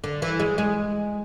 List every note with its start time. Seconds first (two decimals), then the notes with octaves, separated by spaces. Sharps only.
0.04 D3
0.22 E3
0.40 G#3
0.58 G#3